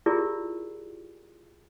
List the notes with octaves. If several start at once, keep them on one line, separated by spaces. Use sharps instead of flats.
E4 F4 G4 G#4 A#4 D5